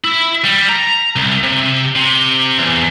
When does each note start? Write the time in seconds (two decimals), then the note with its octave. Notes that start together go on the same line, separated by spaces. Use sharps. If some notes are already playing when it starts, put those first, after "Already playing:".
0.04 E4
0.44 G3
0.69 A#5
1.16 C2
1.43 C3
1.96 C3
2.58 E2